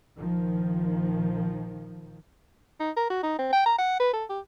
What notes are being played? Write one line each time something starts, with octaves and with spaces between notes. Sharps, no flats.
A#1 D#3 F3
D#4
A#4
F#4
D#4
C4
G5
A#5
F#5
B4
A4
G4